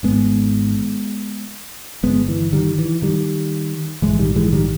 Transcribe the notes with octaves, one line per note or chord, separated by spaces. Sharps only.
G#1 G#2 G#3 B3
G1 G2 G#3 B3
E3
D#3 G3
E3
D#3 G3
A#1 G#2 E3 G#3
D#3 G3
E3 G#3
D#3 G3